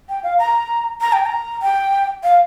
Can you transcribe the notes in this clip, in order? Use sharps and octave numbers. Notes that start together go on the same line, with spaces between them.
G5
F5
A#5
A#5
G5
A#5
G5
F5